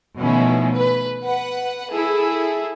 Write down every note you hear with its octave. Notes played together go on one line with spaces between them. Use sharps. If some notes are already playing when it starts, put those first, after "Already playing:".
B2 D#3 F3 A3 C#4 E4
B4
B4 F#5
E4 G#4 A4